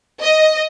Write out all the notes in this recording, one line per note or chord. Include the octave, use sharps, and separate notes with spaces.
D#5